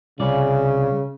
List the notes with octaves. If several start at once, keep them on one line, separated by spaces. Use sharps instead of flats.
C2 C#3 F4 D5